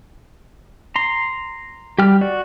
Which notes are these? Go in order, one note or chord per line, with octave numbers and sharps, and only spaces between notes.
A#5 C6
G3 G4 G5 F6
F#4 D5